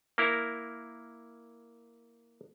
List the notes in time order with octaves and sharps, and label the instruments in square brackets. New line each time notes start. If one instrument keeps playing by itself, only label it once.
[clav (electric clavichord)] A#3 E4 A#4